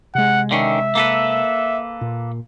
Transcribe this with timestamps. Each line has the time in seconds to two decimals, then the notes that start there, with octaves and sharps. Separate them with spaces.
0.15 C3 G#3 F#5
0.51 D3 D#3 C#4 E5
0.95 A#3 A4 B4
2.01 A#2